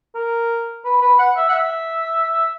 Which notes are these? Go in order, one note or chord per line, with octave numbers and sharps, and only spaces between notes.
A#4
B4
B4
F#5
E5
F#5
E5